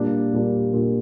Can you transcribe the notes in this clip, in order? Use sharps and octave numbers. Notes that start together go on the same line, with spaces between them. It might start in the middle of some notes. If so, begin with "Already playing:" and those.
Already playing: A#2 G3 A#3 D4
A#2 G3 A#3 D4
A#2 G3 A#3 D4